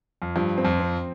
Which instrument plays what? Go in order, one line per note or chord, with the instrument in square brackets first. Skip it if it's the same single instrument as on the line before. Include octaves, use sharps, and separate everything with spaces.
[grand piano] F2
[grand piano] G2 [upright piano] F3
[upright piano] C4
[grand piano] F2
[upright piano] C4